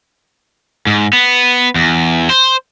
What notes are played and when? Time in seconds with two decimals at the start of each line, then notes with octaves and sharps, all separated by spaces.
0.87 G#2
1.13 B3
1.76 E2
2.30 C5